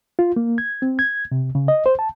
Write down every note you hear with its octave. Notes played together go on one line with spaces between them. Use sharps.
F4
A#3
G#6
C4
G#6
C3
C#3
D#5
C5
A5